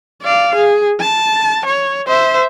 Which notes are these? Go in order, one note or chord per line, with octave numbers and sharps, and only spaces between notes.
D5 F5
G#4
A5
C#5
C5 E5